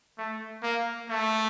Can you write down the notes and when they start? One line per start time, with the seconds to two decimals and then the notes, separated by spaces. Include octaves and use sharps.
0.18 A3
0.63 A#3
1.09 A3